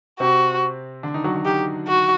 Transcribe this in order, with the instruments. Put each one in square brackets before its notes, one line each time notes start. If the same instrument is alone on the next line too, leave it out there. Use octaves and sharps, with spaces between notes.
[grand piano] C3 C4 [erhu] F#4
[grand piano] D3 D4
D#3 D#4
F#3 F#4
F#3 F#4
[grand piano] D#3 D#4 [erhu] G4
[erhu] F#4